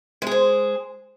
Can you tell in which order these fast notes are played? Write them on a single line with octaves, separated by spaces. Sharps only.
G#3 G#4 C5